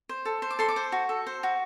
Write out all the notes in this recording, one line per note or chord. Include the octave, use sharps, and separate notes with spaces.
C5
A4
C5
D6
A4 C6
D6
C5
F#4
A4
C5
F#4